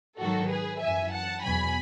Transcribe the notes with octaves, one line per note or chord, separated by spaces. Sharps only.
G#2 D#3 F#3 F#4 A4
G#4 B4
F#2 E3 E5 G#5
F#5 A5
E2 B2 F#3 G#5 B5